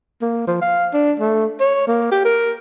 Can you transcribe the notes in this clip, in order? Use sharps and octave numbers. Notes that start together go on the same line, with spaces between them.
A#3
F3
F5
D4
A3
C#5
A#3
G4
A#4